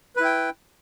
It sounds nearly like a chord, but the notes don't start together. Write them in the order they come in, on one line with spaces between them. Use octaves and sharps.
B4 E4 G5